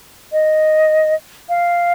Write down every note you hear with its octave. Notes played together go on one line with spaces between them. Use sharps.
D#5
F5